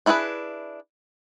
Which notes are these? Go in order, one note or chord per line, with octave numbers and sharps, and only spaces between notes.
D4 E4 G#4 A4 B4